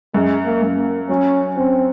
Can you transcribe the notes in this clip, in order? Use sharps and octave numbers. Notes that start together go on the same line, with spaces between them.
F#2 G#3
A#3
F#2
A#3
F#3 C#4
C4 C#4